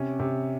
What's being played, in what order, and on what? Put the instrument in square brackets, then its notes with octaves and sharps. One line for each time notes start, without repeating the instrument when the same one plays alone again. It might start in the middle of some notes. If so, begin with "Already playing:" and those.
Already playing: [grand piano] C3 C#4
C3